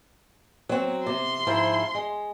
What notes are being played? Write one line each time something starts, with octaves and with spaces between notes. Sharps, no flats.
F#3 C4
C3 C6
G#2 F3 E4
G#3